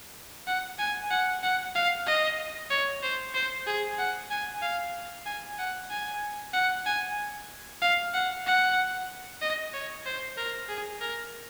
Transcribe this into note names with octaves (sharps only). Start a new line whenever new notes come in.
F#5
G#5
F#5
F#5
F5
D#5
C#5
C5
C5
G#4
F#5
G#5
F5
G#5
F#5
G#5
F#5
G#5
F5
F#5
F#5
D#5
C#5
C5
A#4
G#4
A#4